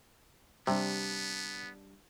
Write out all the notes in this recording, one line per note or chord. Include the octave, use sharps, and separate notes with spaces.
C3 G3 B3 D4